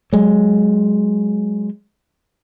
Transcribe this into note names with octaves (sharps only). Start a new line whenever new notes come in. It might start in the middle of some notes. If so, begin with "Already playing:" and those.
F#3 G#3